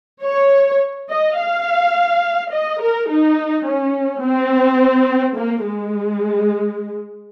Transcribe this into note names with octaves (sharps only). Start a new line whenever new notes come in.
C#5
D#5
F5
D#5
A#4
D#4
C#4
C4
A#3
G#3